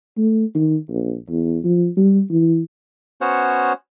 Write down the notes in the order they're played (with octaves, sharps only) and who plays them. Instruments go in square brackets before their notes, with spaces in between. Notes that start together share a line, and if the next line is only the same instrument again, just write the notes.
[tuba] A3
D#3
A#1
E2
F3
G3
E3
[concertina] B3 C#4 F#4 C5 C#5 F#5